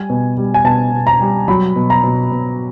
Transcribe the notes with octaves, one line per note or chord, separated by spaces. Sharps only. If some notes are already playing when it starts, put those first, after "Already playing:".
Already playing: G3 G#5
B2
G3
G#5
B2 A5
B2
A#5
G3
F#3 B5
B2
A#5
B2
B2